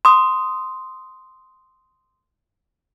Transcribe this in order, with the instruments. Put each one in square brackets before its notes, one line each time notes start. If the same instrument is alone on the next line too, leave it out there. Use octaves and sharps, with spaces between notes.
[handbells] C6 D#6